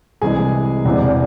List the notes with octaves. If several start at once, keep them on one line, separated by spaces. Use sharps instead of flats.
C2 C3 E3 G#3 G#4 G#5
E1 E2 C3 E3